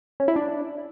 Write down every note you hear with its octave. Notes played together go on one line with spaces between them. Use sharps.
C#4
E4
D4